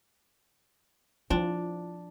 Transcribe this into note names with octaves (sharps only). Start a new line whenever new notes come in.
F3 D4 E4